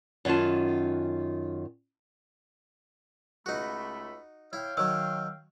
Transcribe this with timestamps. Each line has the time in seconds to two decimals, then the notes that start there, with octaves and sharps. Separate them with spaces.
0.25 F#2 D#3 C#4 F4 A5
3.46 C#2 A3 D#4 F#4 B5
4.53 E4 C#5 F5 G5
4.77 D#3 F#3 E6